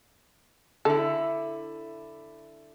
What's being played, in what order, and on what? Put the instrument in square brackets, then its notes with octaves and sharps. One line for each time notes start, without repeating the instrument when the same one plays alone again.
[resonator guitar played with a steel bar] D3 E4 [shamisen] A4